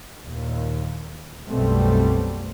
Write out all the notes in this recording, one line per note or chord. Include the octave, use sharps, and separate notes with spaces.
D#2 A#2
B1 F#2 B2 G3 A3 C4